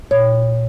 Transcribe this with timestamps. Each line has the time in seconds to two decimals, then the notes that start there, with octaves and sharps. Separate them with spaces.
0.11 A#2 C#5